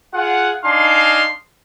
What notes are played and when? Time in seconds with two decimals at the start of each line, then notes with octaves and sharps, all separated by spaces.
0.13 F4 G#4 F#5
0.64 D4 D#4 F5 G#5 C6